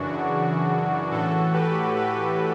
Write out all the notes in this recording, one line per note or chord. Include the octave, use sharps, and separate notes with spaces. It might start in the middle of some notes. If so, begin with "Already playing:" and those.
Already playing: F#2 C#3 E3 D4 F#4
A2 E3 F#4 A4
G4 B4
G4 B4